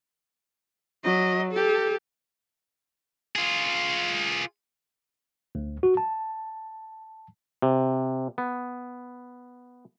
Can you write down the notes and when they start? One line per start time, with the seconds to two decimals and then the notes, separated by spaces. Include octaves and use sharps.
1.04 F#3 D#5
1.52 G4 A4
3.36 F4 G#4
5.55 D2
5.83 F#4
5.97 A5
7.62 C3
8.38 B3